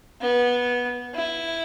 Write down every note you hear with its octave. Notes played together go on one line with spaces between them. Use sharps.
B3
E4